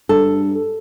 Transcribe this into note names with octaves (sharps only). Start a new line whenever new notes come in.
G2 A4